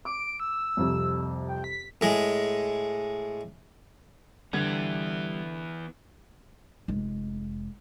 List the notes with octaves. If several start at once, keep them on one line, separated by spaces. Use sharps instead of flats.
D6 D7
E6
C2 F2 C3
G5
B6
A2 G#3
D3 E3 G3 B3 G#6
F1 G#3